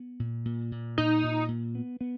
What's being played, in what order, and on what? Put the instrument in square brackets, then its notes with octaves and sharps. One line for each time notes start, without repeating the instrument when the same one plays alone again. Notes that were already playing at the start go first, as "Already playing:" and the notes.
Already playing: [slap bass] B3
A#2
A#2
A#2
[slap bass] A#2 [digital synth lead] D#4
[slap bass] A#2
A#2
B3
B3